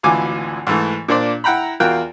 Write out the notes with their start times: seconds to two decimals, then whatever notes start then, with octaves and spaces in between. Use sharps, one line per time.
0.03 G#1 D2 E3 F4 G#5 D6
0.67 G#2 E3 A3
1.08 A#2 A#3 D4 C5 D5
1.44 E4 F#5 G5 A#5 B5
1.80 E2 F4 F#4 A#4 G5 F#6